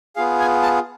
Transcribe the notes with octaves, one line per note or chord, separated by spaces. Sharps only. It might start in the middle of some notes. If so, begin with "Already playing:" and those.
B3 F4 G#4 F5
G#5
A5